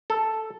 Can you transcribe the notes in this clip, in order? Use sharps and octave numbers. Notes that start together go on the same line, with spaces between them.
A4